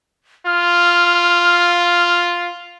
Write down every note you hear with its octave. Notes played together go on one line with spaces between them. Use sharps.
F4 F6